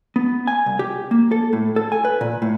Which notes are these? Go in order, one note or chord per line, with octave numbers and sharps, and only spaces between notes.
B3
G#5
C2
G4
A#3
A4
A2
A4
G#5
B4
A#2
A2